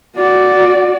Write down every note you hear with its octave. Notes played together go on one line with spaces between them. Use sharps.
F#4 D5